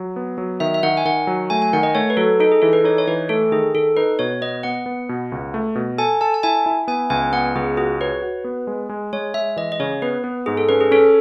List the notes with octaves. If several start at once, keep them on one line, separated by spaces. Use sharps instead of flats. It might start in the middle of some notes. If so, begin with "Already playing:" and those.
Already playing: F#3
B3
F#3
D#3 E5
E5
D#3 F#5
G#5
D#3 F#5
F#3
A3 G#5
G#5
D#3 F#5
D#5
A3 C#5
B4
F#3 A4
D#4 A4
G#4
E3 A4
B4
D#4 C#5
C#5
E3 B4
A3 A4
D#3 G#4
D#3 A4
D#4 B4
B2 C#5
B3 D#5
B3 F#5
B3
B2
C#2
A3
B2
A4 G#5
A4 A5
A5
E4 G#5
E4
B3 G#5
C#2 G#5
B3 F#5
C#2 G#4
F#4 G#4
B4 C#5
F#4
B3
G#3
G#3
G#3 C#5
G#3 E5
E3 D#5
D#5
C#3 C#5
B3 B4
B3
G#2 G#4
A4
C#4 B4
G#4
C#4 A4